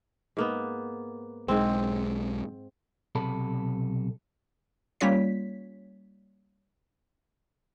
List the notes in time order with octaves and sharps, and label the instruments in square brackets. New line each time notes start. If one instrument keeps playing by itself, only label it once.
[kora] G#2 A#3 B3
[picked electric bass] B1 G#3 [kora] G#2 C4
[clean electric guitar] B1 C3 A4 B5
[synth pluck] G3 A#3 C#4 F4 C#5 B6